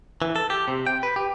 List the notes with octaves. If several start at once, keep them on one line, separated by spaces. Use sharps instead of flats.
E3
A4
G4
C3
G5
B4
G4